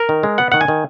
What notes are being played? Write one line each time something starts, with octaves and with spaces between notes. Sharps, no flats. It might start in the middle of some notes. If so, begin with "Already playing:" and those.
Already playing: A#4
D#3
G#3
B3 F#5
D#3 F#5
G#5
D#3